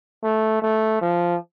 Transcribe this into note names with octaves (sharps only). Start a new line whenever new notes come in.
A3
A3
F3